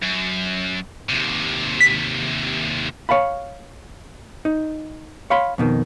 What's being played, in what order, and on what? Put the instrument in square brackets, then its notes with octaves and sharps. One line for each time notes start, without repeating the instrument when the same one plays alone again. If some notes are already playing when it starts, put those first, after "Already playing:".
[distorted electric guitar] F#2
D#2 C3
[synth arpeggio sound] B6
[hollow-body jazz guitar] C#5 F5 A5 B5
D#4
C#5 F5 B5 C6
F2 B2 D#3